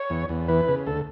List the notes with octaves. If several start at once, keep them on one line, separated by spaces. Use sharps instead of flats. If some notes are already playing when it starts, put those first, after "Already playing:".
Already playing: C#5
E2
E2
E3 B4
C#3
D2 A4